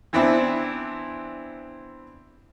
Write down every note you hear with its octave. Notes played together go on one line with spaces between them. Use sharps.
E3 B3 C4 D4 E4